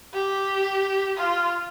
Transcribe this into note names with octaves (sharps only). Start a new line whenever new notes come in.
G4
F4